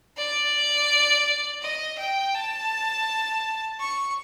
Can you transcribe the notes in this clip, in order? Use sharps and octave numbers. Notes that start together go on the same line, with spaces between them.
D5
D#5
G5
A5
C#6